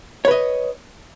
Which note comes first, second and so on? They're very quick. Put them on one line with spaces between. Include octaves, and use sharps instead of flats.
C#5 B4 D#5